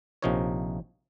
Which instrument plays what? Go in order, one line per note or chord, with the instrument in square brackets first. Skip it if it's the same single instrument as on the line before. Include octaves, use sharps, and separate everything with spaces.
[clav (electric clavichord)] A#1 C3 F3 D#4 A#4 C#5